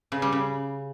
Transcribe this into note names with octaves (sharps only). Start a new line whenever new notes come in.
C#3
G3
C#3